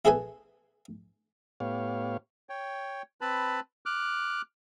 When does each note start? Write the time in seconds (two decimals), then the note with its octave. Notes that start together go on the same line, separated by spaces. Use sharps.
0.05 E4 G#4 A4 B4 G#5
1.60 A2 B3 G4 C#5 F5
2.49 C#5 G5
3.21 C4 B4 A5 B5
3.86 D6 F6 F#6